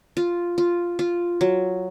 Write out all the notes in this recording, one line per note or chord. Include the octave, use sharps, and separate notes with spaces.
F4
F4
F4
F#3